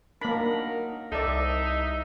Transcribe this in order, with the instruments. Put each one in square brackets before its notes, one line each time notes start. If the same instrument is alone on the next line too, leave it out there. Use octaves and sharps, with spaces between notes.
[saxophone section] F#3 D#4 A#4 [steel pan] A#3 B5 [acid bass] D4
[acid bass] C2 [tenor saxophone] D#4 [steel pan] A4 D5 [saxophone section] E5